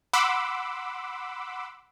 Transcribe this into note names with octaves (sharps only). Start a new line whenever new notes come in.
F#5 B5 C6 D6 E6